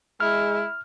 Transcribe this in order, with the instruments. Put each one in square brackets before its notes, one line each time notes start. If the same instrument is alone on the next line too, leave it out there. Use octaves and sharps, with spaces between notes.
[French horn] G#3 [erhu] E4 [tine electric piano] F6